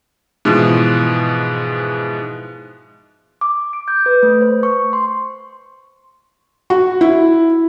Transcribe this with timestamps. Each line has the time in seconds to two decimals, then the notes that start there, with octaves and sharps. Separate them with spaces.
0.45 G#2 B2 E3 F3
3.41 D6
3.73 D7
3.88 G6
4.06 B4
4.23 A3
4.41 C5
4.63 C#6
4.93 C6
6.70 F#4
7.01 E4